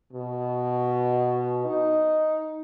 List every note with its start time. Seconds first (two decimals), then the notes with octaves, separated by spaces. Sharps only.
0.13 B2
1.65 D#4